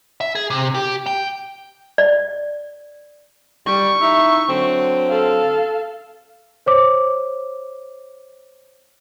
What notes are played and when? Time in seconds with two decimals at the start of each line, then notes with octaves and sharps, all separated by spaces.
0.21 E5
0.35 G#4
0.50 C3
0.75 G4
1.06 G5
1.98 D5
3.67 G3 C#6
4.01 D#4 E4 E5
4.48 D3 F#3 C4
5.10 A4 F5
6.66 C5 C#5 D6